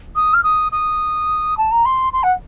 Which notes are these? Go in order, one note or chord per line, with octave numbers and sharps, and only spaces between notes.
D#6
F6
D#6
D#6
A5
A#5
C6
C6
F#5